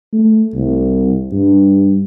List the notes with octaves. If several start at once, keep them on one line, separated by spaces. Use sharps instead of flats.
A3
C2
G2